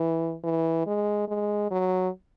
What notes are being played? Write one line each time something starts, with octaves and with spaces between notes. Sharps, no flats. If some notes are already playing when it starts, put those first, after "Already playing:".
Already playing: E3
E3
G#3
G#3
F#3